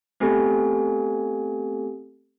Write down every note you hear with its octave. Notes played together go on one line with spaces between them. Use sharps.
A3 B3 C4 G4 A4 G#5